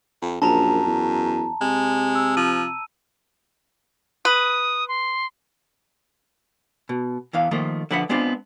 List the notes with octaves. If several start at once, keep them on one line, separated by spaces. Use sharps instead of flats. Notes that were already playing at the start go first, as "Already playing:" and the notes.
F2
A#1 F#2 A5 A#5
E2
C3 G#3
E6
F3 D#7
B4 D#6
C6
B2
E2 E3 F5
D#3 F3 A3 A#3
D3 F3 B4 E5 F#5
G#3 B3 C4 D4 F4